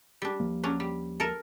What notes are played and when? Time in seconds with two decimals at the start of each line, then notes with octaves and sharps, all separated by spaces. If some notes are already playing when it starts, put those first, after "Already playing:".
0.22 G3 D4
0.40 D#2 F3 A#3
0.63 F#3 C#4 D4
0.80 G3
1.20 A4 A#4